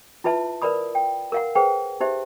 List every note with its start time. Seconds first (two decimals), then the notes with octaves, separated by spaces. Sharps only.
0.24 E4 F4 B4 E5 A5
0.62 A#4 B4 D5 B5 D#6
0.95 G5
1.32 A#4 F5 F#5
1.55 G#4 B4 C5 F#5 G5
2.00 D#4 G4 C5 E5